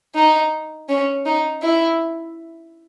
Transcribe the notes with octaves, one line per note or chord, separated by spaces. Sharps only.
D#4
C#4
D#4
E4